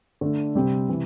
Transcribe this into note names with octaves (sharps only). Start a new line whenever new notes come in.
D3 A3 D4
C3 G3 C4 G4
C3 E3